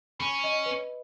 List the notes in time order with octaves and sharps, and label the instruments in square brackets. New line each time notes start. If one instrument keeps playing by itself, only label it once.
[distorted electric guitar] C#4 [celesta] B5
[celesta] D#5
B4